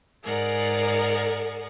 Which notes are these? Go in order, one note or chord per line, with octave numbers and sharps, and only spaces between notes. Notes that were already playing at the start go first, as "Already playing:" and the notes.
G#2 G#4 A#4 D5 F#5